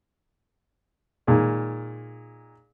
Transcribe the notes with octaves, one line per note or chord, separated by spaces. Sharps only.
A#2 D#3 G#3